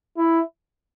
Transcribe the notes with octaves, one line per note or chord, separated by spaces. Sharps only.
E4